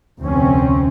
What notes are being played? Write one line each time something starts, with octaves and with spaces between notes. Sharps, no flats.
F1 D2 C4 C#4